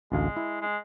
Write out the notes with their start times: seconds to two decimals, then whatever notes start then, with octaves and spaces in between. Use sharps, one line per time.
0.12 A1 D2 G#3 F5
0.36 E4
0.61 G#3